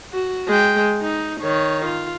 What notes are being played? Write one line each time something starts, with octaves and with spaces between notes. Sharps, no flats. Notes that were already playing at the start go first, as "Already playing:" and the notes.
F#4
G#3 G5
D#4
D#3 C#5
F4